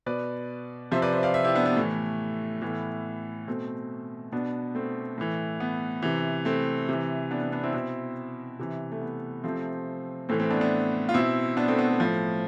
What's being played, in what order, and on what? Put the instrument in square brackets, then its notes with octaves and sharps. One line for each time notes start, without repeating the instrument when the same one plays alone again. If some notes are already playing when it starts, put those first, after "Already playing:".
[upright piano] B2 B4 D5
C3 F3 C5 E5
B4 D5
C5 E5
D5 F5
C5 E5
E4 G4
B3 D4
B3
A2 E3 A3
A2 E3 B3
B2 A3 C4
B2 B3 D4
A3 C4
A2 E3
B3
C3 E3
A3 C4
C3 E3
B3 D4
B3
B3 D4
C4 E4
B2 C4 E4
C3 E3
A3
B3
C3 F3 A3 C4
A2 E3 A3 C4
A3 C4
B3 D4
B3 D4
F4
B2 C4 E4
B3 D4
A3 C4
B3
A3
A2 F3